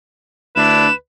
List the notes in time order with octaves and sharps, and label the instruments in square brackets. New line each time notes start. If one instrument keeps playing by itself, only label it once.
[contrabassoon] D2 [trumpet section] D4 E4 [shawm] B4 [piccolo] E7